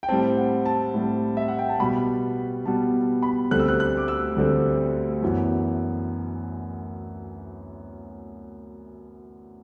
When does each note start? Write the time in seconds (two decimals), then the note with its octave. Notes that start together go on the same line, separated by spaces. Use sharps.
0.03 G5
0.08 A2 G3 C4 A5
0.37 F#5
0.65 A5
0.94 A2 G3 C4
1.37 E5
1.48 F#5
1.59 G5
1.69 A5
1.80 B2 G3 B3 B5
2.65 B2 G3 B3 A5
3.23 B5
3.51 D2 D3 G3 C4 F#6
3.59 E6
3.68 F#6
3.80 F#6
3.97 D6
4.08 E6
4.36 D2 D3 G3 C4
5.22 F#2 E3 B3